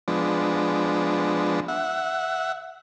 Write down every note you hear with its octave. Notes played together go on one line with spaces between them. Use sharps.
F3 G#3 B3 D4
E5 F#5